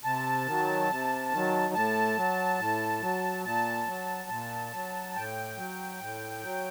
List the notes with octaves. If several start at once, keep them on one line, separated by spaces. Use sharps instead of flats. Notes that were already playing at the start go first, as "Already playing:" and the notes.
C3 A5
D#3 F#3
C3
D#3 F#3
A2 A5
F#3
A2
F#3
A#2 A5
F#3
A#2
F#3
A2 G5
F#3
A2
F#3